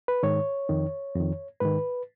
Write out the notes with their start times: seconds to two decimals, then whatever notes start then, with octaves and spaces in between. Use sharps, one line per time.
0.08 B4
0.23 G#2 D#3 C#5
0.69 F2 D#3
1.15 F2 D#3
1.60 G#2 D#3 B4